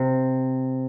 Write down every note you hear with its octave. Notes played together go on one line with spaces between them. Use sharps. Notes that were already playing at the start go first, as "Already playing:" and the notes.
Already playing: C3